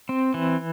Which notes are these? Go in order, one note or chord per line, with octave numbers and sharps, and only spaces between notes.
C4
E3